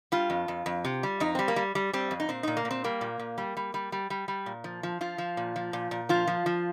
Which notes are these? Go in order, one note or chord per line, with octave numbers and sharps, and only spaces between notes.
G3 F4
F2
F2
F2
C3
G3
F2 D#4
G3 C4
A#3
G3
G3
G3 C4
F2
D#4
A#2 C4
A#2 D#4
A#3
A#2
C4
G3 A#3
A#2
A#2
G3
G3
G3
G3
G3
G3
A#2
F3
F3
F3 F4
F3
A#2
F3
A#2
A#2
F3 F4
F3
F3